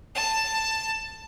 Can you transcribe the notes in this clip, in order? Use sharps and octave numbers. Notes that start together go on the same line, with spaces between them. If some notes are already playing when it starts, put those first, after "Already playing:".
A5